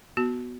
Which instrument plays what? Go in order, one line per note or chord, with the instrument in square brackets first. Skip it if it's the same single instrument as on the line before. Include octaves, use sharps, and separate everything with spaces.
[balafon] B3 F#4